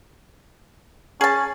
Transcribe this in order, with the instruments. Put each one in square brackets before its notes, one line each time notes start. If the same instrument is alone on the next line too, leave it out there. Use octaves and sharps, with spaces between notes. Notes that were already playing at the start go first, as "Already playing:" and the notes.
[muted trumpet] C#4 [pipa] G#4 A5